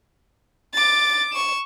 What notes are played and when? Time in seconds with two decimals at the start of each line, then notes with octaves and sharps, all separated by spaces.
0.74 D6 A6
1.34 C#6 E7